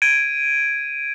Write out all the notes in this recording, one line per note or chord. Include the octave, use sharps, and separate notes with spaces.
G#6 D7 D#7